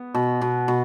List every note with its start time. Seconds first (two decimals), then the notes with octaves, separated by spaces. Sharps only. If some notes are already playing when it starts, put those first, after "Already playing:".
Already playing: B3
0.14 B2
0.41 B2
0.68 B2